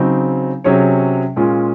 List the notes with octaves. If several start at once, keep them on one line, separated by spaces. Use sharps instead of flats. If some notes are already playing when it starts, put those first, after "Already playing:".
Already playing: C#3 F#3 C4 D#4
C3 F#3 C#4 G#4 C#5
A#2 G#3 C#4 F4 G#4